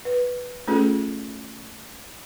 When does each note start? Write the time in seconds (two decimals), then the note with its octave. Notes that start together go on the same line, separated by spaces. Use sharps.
0.05 B4
0.68 A3 C#4 F4 G#4 A4